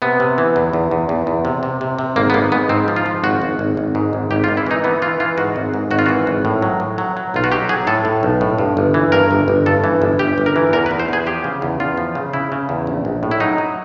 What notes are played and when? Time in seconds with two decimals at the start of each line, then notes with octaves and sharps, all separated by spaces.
0.02 C3 B3
0.20 C3
0.38 E3
0.56 E2
0.73 E2
0.91 E2
1.09 E2
1.27 E2
1.45 C3
1.63 C3
1.81 C3
1.99 C3
2.16 G#1 A#3
2.30 B3
2.34 G#1 A#3
2.52 G#2 B3
2.69 G#2 C4
2.88 F3
2.96 F4
3.06 F3
3.24 G#1 F#4
3.42 G#1
3.59 G#1
3.77 G#1
3.95 G#2
4.13 G#1
4.31 G#1 G4
4.44 F4
4.48 G#1
4.57 E4
4.66 E3 D#4
4.84 E3 B3
5.02 E3 F4
5.20 E3 F4
5.38 G#2 F#4
5.56 G#1
5.74 G#2
5.91 G#1 F#4
5.99 F4
6.06 E3 F#4
6.27 G#1
6.45 A2
6.62 F#3
6.80 A2
6.98 F#3
7.17 F#3
7.34 B1 F4
7.44 F#4
7.52 F#3 G4
7.69 F#3 G#4
7.87 A2 A4
8.05 A2
8.23 B1
8.41 A2
8.58 G2
8.77 G1
8.94 E3
9.12 G2 A#4
9.31 G1
9.48 G1
9.66 G2 A4
9.84 E3
10.02 G1
10.19 G1 G4
10.38 G1
10.46 A#4
10.56 E3
10.73 E2 A#4
10.86 B4
10.91 E2
11.00 C5
11.09 E2 G#4
11.26 F3 G4
11.44 C#3
11.62 E2
11.80 E2 F4
11.97 F3
12.15 C#3
12.33 C#3 E4
12.52 C#3
12.69 E2
12.87 A#1
13.05 A#1
13.23 A2
13.31 E4
13.40 F#3 D#4
13.58 F#3